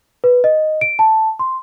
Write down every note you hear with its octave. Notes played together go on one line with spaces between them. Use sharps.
B4
D#5
D7
A5
C6